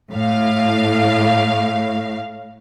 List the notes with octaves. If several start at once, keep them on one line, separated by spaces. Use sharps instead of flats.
A2 F5